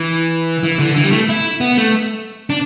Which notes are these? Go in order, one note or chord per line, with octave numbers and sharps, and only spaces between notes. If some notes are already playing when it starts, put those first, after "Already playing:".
Already playing: E3
E3
D3
E3
G3
A3
E4
B3
A3
D4